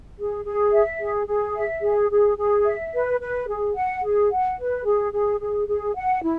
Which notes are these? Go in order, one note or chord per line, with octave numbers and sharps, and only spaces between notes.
G#4
G#4
E5
G#4
G#4
E5
G#4
G#4
G#4
E5
B4
B4
G#4
F#5
G#4
F#5
B4
G#4
G#4
G#4
G#4
F#5
E4